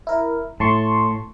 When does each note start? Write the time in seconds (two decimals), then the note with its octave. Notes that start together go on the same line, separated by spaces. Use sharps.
0.07 E4 A#4
0.60 A2 A5 C6 C#6